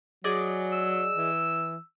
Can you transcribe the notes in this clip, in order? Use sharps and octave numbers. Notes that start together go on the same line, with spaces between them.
F#3 G#4 D5 D#5
E6
E3